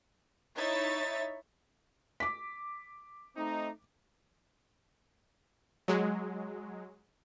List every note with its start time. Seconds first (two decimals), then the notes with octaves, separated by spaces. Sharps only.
0.57 D#4 E4 C#5 E5 A6
2.20 D6 B6
3.36 A3 C4 D#4
5.88 F#3 G#3